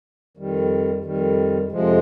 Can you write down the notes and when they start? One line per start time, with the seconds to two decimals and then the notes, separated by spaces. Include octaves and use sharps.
0.37 F2 D#3 G3
1.04 F2 D#3 G3
1.72 F2 C3 F3 G#3